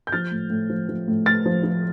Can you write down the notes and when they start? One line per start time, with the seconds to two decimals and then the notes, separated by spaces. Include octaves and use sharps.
0.07 G6
0.12 F3 F6 A6
0.31 A2
0.50 A2
0.70 F3
0.89 F3
1.08 A2
1.26 A2 F6 A6
1.46 F3
1.63 F3